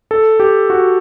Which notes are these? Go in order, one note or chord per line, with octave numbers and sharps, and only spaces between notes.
A4
G4
F#4